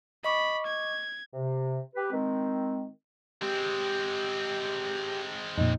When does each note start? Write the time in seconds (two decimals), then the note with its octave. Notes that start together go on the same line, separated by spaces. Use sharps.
0.24 D#5 B5 C#6 D6
0.66 G#6
1.33 C3
1.96 G4 B4
2.12 D#3 G#3 C4
3.42 G#3 C4 G4
5.58 F2 A#2 D#4